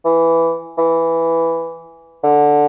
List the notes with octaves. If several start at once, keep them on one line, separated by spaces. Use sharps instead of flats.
E3
E3
D3